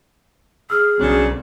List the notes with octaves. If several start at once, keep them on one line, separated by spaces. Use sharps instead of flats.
G#4 E6 F6
B1 C#3 F#3 C4 D4